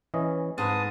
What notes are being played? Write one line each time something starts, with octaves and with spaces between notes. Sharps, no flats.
E3 C#4 D#5
G#2 C4 B4 A5 D#6